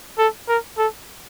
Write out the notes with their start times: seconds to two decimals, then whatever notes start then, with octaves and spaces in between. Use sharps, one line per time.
0.18 A4
0.48 A#4
0.78 A4